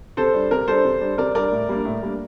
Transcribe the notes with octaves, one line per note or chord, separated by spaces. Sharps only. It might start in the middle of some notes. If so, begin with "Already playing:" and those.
C3 A4 C5
G3 D4
C3 A#4
G3 D4 A4 C5
C3
G3 D4
C3 A#4 D5
G3 D4 A#4 D5
A2
G3 A#3 D4
A2
G3 A#3 D4